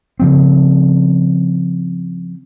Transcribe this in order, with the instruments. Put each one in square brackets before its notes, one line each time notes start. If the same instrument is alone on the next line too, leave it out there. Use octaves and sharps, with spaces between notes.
[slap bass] C#3 F3 C4